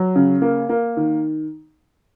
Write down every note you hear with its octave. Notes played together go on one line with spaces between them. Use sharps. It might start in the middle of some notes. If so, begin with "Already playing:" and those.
Already playing: F#3
C#3
A#3
A#3
D#3